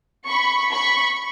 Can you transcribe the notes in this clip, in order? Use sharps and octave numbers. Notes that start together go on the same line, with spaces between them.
B5 C#6
B5 C#6